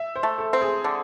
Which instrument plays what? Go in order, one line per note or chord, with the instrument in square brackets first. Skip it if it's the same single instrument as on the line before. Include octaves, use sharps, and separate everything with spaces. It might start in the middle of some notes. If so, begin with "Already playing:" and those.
Already playing: [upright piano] E5
C5
[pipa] A3
[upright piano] A4
[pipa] C4
[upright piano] G#4
[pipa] D3